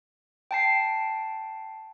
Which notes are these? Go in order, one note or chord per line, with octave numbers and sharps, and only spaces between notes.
G5 A5 C7